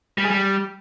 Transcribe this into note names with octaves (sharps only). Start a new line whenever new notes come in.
G3
G#4
G3